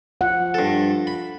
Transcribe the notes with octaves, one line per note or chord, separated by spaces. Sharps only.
F3 F#5
G2 A4
B5